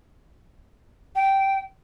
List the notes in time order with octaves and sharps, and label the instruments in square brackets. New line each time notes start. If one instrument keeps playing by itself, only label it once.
[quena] G5